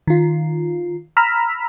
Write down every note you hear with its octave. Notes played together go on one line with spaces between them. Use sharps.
D#3 F4
A#5 B5 E6 F6 B6